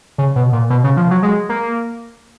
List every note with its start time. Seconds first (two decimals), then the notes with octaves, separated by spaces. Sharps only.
0.18 C#3
0.36 B2
0.52 A#2
0.70 B2
0.84 C#3
0.97 F3
1.11 F#3
1.23 G#3
1.49 A#3